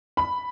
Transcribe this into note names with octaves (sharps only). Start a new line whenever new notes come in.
B5